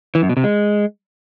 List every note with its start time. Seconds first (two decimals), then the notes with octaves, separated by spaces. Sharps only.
0.15 E3
0.22 F#2
0.29 B2
0.37 C3
0.44 G#3